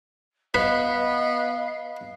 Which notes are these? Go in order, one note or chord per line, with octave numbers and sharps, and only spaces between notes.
B3 B4 D#5 F5